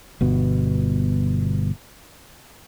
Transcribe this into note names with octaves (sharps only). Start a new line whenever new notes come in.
G1 B2